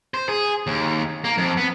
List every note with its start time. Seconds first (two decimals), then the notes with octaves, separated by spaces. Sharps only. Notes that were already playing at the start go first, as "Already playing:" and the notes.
0.14 C5
0.29 G#4
0.67 D#2
1.24 A#3
1.38 F2
1.57 B3